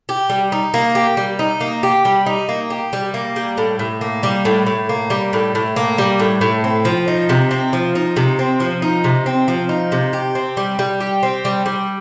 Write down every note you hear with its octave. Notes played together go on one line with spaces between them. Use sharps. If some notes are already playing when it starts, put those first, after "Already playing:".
G4
G3
D#4
A#3
G4
G3
D#4
A#3
G4
G3
D#4
A#3
G4
G3
A#3
G3
A2
A2
A#3
G3
A2
A2
A#3
G3
A2
A2
A#3
G3
A2
A2
C4
F3
D#4
C3
C4
F3
D#4
C3
C4
F3
D#4
C3
C4
F3
D#4
C3
G4
C4
G3
G3
G4
C4
G3
G3